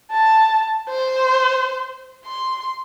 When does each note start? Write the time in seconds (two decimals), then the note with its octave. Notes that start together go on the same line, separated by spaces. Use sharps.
0.11 A5
0.89 C5
2.25 C6